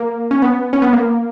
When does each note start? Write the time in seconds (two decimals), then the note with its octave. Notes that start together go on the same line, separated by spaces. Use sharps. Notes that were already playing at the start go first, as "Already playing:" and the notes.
Already playing: A#3
0.31 C#4
0.42 B3
0.73 C#4
0.82 B3
0.93 A#3